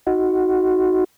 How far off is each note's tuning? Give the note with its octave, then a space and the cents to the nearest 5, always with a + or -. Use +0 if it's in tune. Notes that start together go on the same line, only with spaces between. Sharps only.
D#4 +15 F#4 +0